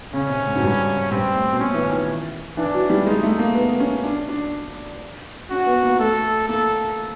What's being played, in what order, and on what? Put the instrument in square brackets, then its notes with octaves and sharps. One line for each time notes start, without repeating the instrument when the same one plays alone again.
[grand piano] C#3 [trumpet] C#4
[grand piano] C3
G#2
F#2
G2
[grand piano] G2 [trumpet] C4
[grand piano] A2
B2
[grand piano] A#2 [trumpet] C#4
[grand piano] E3
D#3
[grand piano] E3 [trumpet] D4
[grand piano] F#3
G3
[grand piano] G#3 [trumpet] D#4
[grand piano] A3
A#3
B3
C#4
D4
D4
[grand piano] C#4 [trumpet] F#4
[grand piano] B3
A#3
[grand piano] A3 [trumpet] A4
[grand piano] A#3 [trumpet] A4